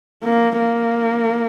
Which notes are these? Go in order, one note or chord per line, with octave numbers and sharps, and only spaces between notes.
A#3
A#3